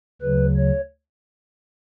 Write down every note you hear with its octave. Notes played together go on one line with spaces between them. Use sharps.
D2 C#3 F#3 B4
C#5